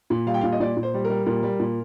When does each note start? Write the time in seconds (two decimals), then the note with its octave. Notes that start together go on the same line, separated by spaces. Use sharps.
0.10 A#2
0.27 G3 F5
0.34 G5
0.41 A#2 F5
0.52 D#5
0.60 A#2 D5
0.77 A#2
0.83 C5
0.94 G3
1.04 A#4
1.10 G3
1.26 A#2 A#4
1.43 G3
1.60 A#2